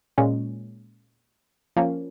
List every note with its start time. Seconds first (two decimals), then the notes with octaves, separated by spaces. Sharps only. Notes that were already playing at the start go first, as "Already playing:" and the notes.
0.18 A#2 G#3 C#4
1.76 F3 A#3 C#4